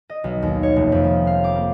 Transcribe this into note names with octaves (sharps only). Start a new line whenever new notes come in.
D#5
B1
D#2
C#5
F1
F2
G#3
F5
D6
A#3